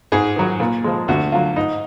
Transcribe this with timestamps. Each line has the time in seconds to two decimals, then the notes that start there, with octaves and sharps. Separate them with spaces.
0.12 G#2 G#4
0.36 D#3 F#3
0.60 A#2
0.84 F3 G#3
1.08 D2 F#4
1.32 D3 F#3 F4
1.56 G#2 D#4